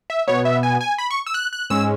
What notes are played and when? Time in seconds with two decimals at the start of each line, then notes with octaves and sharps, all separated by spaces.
0.10 E5
0.28 B2 B3 C#5
0.45 E5
0.63 G#5
0.81 G#5
0.98 B5
1.11 C#6
1.27 E6
1.34 F#6
1.53 F#6
1.70 G#2 G#3 C#4 E6